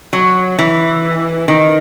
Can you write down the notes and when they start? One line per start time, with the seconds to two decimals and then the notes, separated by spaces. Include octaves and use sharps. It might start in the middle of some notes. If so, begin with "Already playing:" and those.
0.13 F#3
0.59 E3
1.48 D#3